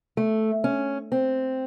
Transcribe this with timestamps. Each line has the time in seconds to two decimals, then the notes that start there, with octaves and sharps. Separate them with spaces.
0.17 A3
0.64 C#4
1.12 C4